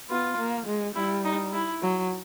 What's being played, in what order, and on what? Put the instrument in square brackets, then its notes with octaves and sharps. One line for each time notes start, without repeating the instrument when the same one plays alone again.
[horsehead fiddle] B3 [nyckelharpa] F4
[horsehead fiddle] A#3
G#3
[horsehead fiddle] G3 [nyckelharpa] E4
[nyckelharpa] D#4
E4
[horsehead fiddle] F#3